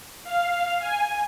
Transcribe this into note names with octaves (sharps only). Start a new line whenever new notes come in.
F5
G#5